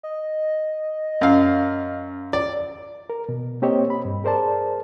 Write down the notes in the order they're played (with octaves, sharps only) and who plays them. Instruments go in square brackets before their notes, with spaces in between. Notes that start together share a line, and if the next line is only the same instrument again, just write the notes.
[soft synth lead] D#5
[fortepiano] F#2 F5
D5
[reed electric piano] A#4
B2
A#3 C4 G4 C5 C#5 D#5
B5
G2
G#4 A#4 C5 D5 A5